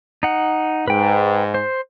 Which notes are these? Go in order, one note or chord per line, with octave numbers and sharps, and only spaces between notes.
D#4 F#5
G#2 B4 G5
C5